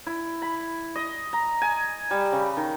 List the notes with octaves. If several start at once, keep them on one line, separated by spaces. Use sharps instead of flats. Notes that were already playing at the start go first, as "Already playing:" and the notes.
E4
B5
D#5
A#5
G#5
G3
C#3
D#3